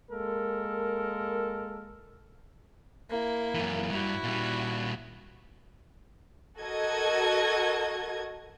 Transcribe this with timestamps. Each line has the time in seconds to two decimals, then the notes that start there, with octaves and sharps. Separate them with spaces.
0.10 G#3 A#3 A4 A#4
3.10 A#3 E4
3.55 F#2 E3
3.91 G2 E4 F#4
4.24 A#2 G3
6.60 F#4 A4 A#4 D#5 G#6